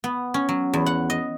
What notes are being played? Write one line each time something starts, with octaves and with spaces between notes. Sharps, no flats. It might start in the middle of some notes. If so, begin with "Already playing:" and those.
B3
C#4
F#3
E2
F#5
D#5